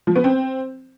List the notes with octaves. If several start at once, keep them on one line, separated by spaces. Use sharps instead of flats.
F3
B3
C4